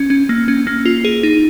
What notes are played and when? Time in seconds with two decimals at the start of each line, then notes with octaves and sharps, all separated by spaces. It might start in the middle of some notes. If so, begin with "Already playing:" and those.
Already playing: C#4
0.10 C#4
0.29 A#3
0.48 C#4
0.67 A#3
0.85 F4
1.05 G#4
1.23 D#4